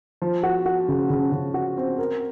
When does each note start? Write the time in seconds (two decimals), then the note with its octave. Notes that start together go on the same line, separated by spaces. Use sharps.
0.22 F3
0.43 F#4
0.66 F#4
0.88 C#3
1.10 C#3
1.32 C#3
1.54 F#4
1.77 C4
1.98 A#4